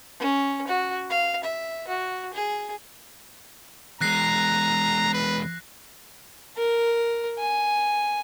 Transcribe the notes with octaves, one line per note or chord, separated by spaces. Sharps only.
C#4
F#4
F5
E5
F#4
G#4
E2 G#3 A#5 F#6 A#6 C7
B4
A#4
G#5